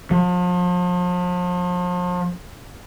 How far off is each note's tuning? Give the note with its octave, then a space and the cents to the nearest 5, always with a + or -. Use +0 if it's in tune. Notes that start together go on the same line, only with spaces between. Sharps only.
F3 +40